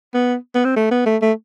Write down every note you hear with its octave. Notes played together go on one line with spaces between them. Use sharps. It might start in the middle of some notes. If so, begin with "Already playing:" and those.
B3
B3
C4
A3
B3
A3
A3